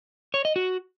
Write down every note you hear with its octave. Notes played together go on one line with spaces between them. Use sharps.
C#5
D#5
F#4